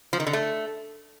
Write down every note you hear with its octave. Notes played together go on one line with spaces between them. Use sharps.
F3
D#3
D3
A3